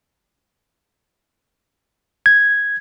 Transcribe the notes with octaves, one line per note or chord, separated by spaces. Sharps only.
G#6